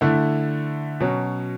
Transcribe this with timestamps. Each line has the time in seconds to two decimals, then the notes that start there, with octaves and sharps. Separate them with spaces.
0.01 D3 A3 E4
1.00 B2 F#3 C#4